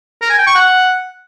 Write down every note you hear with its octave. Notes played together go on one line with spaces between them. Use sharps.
A#4
G#5
G5
C#6
F#5